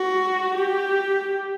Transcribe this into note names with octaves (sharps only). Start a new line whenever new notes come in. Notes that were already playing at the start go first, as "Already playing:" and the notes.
Already playing: F#4
G4